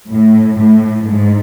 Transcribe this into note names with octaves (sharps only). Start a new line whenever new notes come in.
A2
A2
G#2